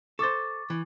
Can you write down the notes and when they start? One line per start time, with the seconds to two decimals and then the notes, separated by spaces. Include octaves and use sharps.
0.19 A4 C5 C#6 D6 A6
0.70 E3